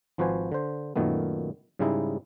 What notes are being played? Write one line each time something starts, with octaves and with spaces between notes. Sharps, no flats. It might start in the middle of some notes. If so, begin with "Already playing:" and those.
G#1 F3 F#4 B4 C5 G#5
D3 C5
F#2 A#2 D#3 A3 B3
G#2 C#3 G3 G#3 D#4 E4